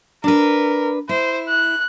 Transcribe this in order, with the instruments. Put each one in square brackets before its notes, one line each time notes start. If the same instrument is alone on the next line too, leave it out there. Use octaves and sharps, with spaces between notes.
[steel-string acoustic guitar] D4 B4 [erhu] A#4
[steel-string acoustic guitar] E4 [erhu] C5
[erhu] F#6